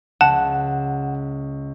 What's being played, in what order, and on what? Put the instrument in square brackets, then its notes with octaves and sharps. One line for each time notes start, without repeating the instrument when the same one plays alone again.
[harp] C#2 [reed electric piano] F#5 [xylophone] A5